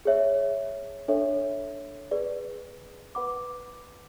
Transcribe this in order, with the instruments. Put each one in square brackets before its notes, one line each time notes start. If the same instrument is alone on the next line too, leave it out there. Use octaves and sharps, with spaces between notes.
[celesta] G#4 C#5 E5
D4 A4 C#5 E5
G#4 B4 D5
B4 F#5 B5 D6